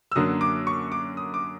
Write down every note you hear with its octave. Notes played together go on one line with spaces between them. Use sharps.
E6
F#2 D3 F#3 A#3 D#6
D6
C#6
D6
D#6
D6